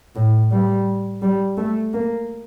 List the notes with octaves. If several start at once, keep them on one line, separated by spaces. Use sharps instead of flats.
A2
G3
G3
A3
A#3